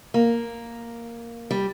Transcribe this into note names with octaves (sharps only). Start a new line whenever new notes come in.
A#3
G3